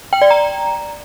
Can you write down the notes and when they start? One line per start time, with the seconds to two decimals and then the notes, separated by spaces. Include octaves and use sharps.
0.13 G5
0.22 D5
0.31 A#5